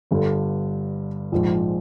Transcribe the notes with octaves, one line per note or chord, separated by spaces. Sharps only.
G1 G2 D3
A#1 G#2 F3